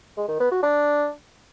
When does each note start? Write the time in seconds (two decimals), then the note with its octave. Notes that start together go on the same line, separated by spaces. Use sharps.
0.17 G#3
0.29 D#3
0.40 B3
0.51 F#4
0.63 D4